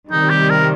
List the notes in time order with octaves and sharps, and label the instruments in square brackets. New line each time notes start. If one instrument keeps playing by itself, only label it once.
[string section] C3 D#3 G3 [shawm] D#4
[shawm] G4
A#4